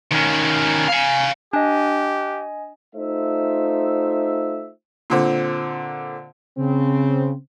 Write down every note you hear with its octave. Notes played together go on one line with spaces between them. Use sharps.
D#3 C#4
F5 G#5
D4 G4 D#5 G#5
A3 D#4 F4 C5 E5
A#2 D3 C4
C#3 C4